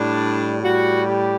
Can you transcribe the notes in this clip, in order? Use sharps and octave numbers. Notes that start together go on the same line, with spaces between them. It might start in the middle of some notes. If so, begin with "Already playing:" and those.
Already playing: A2 G3 D4
A2 G3 F#4
G4